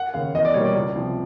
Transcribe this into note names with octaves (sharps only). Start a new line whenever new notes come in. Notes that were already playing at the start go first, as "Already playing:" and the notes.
Already playing: F#5
D#2 C#3 F5
E2 D#5
D5
B2 G3 A#3 C#5
D5
C#2
C3 F3